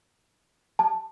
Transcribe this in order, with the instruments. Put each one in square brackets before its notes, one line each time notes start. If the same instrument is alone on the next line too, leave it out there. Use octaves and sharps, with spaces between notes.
[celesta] A5